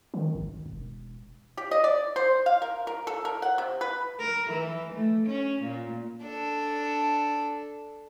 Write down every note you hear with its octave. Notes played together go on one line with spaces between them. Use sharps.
D#3
G#1
E1
G4
D#5
D5
C5
F5
A#4
A#4
A4
A#4
F#5
C3
B4
A#4
E3
A3
C#4
A#2
D4 A4